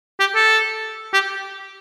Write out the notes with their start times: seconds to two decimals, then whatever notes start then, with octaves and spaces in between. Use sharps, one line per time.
0.20 G4
0.35 A4
1.13 G4